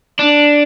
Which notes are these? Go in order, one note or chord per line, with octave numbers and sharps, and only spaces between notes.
D4